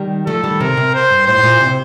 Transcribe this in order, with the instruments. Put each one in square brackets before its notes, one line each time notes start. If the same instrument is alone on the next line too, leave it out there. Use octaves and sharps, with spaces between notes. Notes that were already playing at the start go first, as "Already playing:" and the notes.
Already playing: [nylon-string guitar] D#3 G3
[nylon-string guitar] F3 A3 [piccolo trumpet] A4
[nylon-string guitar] D#3 G3
[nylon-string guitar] C3 [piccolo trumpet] A#4
[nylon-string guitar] C3
[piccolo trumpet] C5
[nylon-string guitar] G2
[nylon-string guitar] A2 [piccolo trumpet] C5
[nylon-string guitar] A2
A#2
C3